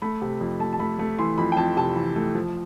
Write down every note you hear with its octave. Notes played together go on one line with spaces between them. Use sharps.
A3 B5
C3
F2
A3 A5
A5
A3 B5
A3
E3 C6
F2 B5
G5
F2 A5
C3 A5
E3
A3
F3